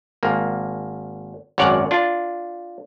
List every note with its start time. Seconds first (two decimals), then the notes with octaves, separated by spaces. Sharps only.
0.23 G#1 A#3
1.58 G#1 F#2 C#5 D5 F#5
1.91 D4 F4